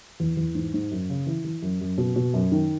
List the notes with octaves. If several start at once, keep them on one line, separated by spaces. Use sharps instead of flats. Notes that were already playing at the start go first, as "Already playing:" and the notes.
E2
E2
G#2
G#2
F#2
C#3
E3
E3
F#2
F#2
B2
B2
F#2
D#3